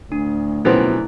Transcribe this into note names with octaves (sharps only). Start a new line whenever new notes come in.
D2 A2 D4
F#2 B2 F3 B3 C4 E4 G#4